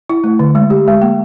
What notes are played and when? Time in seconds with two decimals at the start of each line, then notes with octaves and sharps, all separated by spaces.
0.09 E4
0.24 A3
0.39 D3
0.55 G#3
0.70 G4
0.88 G#3
1.02 A#3